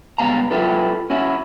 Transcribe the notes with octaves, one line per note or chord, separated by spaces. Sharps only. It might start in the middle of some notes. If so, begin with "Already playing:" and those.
C#2 G3 B3 F5 A#5
F#3 E4 F4 G4 A4 B4
C#4 E4 F#4